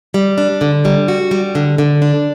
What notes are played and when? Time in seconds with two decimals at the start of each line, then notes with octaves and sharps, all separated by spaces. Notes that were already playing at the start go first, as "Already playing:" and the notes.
0.14 G3
0.38 D4
0.61 D3
0.85 G3
1.08 F#4
1.31 G3
1.55 D3
1.78 D3
2.02 D4